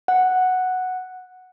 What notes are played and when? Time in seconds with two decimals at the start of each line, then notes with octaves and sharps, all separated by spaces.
0.08 F#5